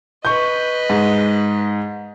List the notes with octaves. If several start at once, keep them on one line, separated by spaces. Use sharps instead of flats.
B4 D#5 C#6 G6
G#2